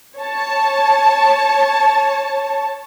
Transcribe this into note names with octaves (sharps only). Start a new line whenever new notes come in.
C#5 A5